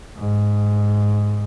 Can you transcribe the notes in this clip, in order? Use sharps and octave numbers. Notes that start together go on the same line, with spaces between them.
G#2